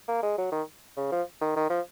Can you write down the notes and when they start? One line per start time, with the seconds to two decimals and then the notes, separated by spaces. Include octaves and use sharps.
0.08 A#3
0.23 G#3
0.38 F#3
0.52 D#3
0.97 C#3
1.12 F3
1.41 D#3
1.56 D#3
1.70 F3